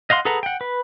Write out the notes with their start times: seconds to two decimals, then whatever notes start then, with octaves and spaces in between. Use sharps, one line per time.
0.10 D#5 F5 F#5 C6
0.25 G#4 A4 B4 F#5 A#5
0.43 F#5 G5
0.61 B4